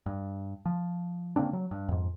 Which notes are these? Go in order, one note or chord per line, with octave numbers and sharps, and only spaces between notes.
G2
F3
C#3 A#3 C4 D4
F#3
G2
F2 G#2